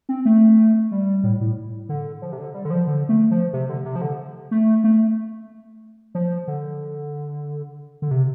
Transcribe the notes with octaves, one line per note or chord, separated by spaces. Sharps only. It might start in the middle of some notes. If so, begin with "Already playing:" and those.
C4
A3
G3
A2
A2
D3
F3
C3
D3
G3
D3
F3
D3
A3
F3
C3
D3
C3
F3
D3
A3
A3
F3
D3
D3
C3